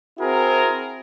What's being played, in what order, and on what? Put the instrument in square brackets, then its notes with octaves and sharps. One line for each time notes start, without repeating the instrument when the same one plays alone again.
[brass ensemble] C4 E4 F#4 G#4 A#4